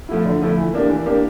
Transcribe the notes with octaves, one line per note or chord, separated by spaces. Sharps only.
F3 A3 E4
D3
F3 A3 E4
E3
A#3 D4 G4
E3
A#3 D4 G4